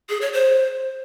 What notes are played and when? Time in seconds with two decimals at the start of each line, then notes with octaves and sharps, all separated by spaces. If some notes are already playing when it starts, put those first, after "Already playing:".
0.09 G#4
0.21 C#5
0.33 C5